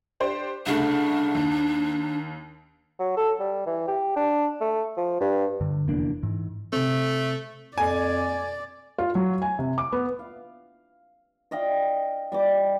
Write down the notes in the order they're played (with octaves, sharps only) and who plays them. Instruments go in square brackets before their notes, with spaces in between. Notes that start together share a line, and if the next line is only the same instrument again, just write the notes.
[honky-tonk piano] D4 G4 C5
[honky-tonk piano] C2 C#3 A3 [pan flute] D4
[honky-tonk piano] D#2
[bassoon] F#3
A4
G3
E3
G4
D4
A3
F3
G2
[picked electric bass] G2 D3
F1 E2 A#3 D4
G#2 E3
[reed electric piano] C3 C4 [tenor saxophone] A3
[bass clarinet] F2 [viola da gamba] D5 [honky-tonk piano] G#5
[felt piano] F4
F#3
G#5
C3
D6
B3
[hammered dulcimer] F5
D5 D#5 F5 G5
G3 D#5 D6